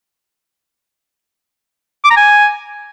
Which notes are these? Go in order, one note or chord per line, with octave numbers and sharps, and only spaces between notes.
D6
A#5
G#5